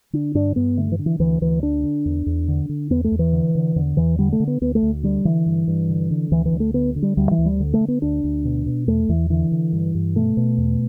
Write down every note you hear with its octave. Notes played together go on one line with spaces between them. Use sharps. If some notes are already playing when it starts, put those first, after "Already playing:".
D3 D4
G2 D4
G2 B3
D3 A3
E3
D3
E3
D2 E3
D2 E3
D3 D4
D3
E2
E2
D3
D3
E2 B3
A3
E2
E3
D3
D3
E2 D3
E2 E3
D3 G3
A3
D3
B3
D2 B3
A3
D2
D3 G3
D3 E3
G2
G2
D3
D3
D2 E3
E3
D2
A3
D3 B3
D3
G3
D2 G3
E3
D2
G3
D3
A3
D3
B3
D2 D4
D2
B2
B2
E2 A3
E2 E3
D3 E3
D3
G2
G2
B2 A3
B2
E2